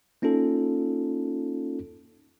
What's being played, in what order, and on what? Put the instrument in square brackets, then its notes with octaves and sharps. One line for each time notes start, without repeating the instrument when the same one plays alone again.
[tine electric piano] A#3 C#4 D#4 F4 A4